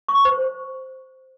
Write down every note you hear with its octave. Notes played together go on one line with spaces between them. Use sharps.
C#6
C5